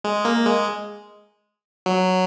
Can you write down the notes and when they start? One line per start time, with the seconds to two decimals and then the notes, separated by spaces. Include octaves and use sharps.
0.04 G#3
0.25 A#3
0.45 G#3
1.86 F#3